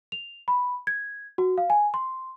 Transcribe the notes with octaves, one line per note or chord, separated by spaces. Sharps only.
F7
B5
G#6
F#4
F5
G#5
C6